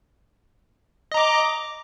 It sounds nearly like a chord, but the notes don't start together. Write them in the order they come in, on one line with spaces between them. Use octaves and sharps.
D#5 A#5 D6